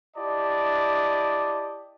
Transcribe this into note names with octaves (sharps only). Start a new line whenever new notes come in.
E4 G4 D5 D#5 A5